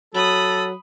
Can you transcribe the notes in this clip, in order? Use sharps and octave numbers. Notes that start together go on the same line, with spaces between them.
F#3 A4 B5 D#6